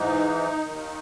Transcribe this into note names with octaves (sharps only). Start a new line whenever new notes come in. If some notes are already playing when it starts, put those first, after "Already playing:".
Already playing: G#2 E3 D#4
D#2 D#3